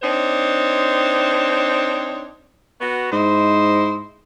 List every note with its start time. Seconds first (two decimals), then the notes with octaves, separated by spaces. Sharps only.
0.02 C4 D4 D#4 C5 C#5
2.81 B3 F#4
3.12 G#2 E4 C5 D#5